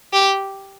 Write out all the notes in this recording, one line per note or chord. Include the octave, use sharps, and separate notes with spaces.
G4